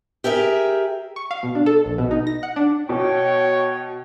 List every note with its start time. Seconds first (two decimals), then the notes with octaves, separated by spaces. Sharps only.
0.24 G4 G#4 A#4 E5
1.16 C#6
1.31 F5
1.43 B2
1.55 D4
1.66 A4
1.85 A#1
1.98 B2
2.11 D#4
2.27 A#6
2.43 F#5
2.56 D4
2.89 B2 C#5 G5